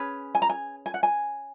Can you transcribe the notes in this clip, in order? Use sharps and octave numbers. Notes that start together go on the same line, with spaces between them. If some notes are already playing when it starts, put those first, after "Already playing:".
Already playing: C#4 G#4 B4
G#5
A#5
G#5
G#5
F#5
G#5